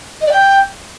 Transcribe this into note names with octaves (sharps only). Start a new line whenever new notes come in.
D#5
D5
G5